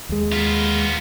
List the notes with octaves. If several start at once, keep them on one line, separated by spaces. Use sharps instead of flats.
D#2 G#3
B3 F4